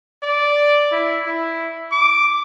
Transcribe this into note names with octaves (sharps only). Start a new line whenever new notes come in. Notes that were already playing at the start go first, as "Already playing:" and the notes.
D5
E4
E4
D6